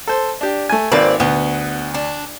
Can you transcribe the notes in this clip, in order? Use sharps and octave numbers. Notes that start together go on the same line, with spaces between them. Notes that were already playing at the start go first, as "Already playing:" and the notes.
A4 C5
D4 G4
A3 G#5
G#1 A#3 C4 B4 D5
D2 B3
D4